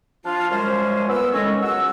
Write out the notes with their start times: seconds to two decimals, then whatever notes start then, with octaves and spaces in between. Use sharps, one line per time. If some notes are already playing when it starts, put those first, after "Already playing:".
0.24 F3 D4 F4
0.50 F#2 F3 G3 G#3 C#4 C5
1.08 B3 E6
1.32 A2 D#3 G#3 C#4 C#5 D#5
1.62 C#2 F#3 F#5 E6